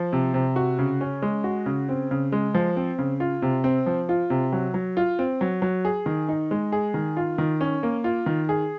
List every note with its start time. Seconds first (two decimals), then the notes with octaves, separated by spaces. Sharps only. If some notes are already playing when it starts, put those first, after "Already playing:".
Already playing: F3
0.13 C3
0.34 C3
0.56 F#4
0.79 C#3
1.01 C#4
1.22 G#3
1.44 F#4
1.66 C#3
1.89 C4
2.11 C#3
2.32 G#3
2.54 F3
2.77 C4
2.98 C#3
3.20 F4
3.42 C3
3.64 C4
3.86 F3
4.09 F4
4.30 C3
4.52 F#3
4.74 F#3
4.97 F4
5.19 C4
5.41 F#3
5.62 F#3
5.85 G#4
6.06 D#3
6.29 D#4
6.51 G#3
6.72 G#4
6.94 D#3
7.17 F4
7.38 D#3
7.61 C#4
7.83 A#3
8.04 F4
8.26 D#3
8.49 G#4